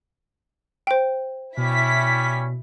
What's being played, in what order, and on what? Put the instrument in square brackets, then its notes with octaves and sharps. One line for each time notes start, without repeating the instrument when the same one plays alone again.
[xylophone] C5 G5
[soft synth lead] B2 [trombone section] G3 C#4 [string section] E4 B6